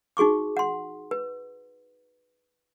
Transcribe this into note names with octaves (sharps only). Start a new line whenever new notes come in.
D#4 F#4 G#4 C#6 D6
F#5 C6
B4